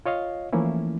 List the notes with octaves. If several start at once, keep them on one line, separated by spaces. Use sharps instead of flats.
F4 C#5 D#5 F5
E3 F3 A3 A#3 C#4 E4